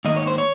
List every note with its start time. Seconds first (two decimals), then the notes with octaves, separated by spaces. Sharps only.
0.05 G#2 D#3 A#3 D#5
0.16 C#5
0.27 C5
0.38 C#5